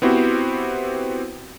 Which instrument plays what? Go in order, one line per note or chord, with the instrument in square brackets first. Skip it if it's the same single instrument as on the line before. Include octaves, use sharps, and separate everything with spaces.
[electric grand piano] B3 C4 E4 F#4 G4 C5